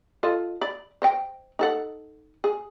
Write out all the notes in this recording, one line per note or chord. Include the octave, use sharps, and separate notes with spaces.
F4 A4 D#5
D5 B5
C5 D#5 G5
D#4 A4 F#5
G#4